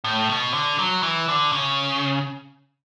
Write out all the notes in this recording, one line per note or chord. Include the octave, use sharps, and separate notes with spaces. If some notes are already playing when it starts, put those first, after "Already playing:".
A2
B2
D3
F#3
E3
D3
C#3